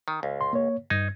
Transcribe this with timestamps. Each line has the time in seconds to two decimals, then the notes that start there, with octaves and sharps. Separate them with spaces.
0.08 D#3
0.23 C#2
0.41 C6
0.53 A#3 C#5
0.90 G2 D#4 G#6